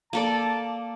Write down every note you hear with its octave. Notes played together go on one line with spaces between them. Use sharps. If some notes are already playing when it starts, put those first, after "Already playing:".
A#3 A4 D5 A5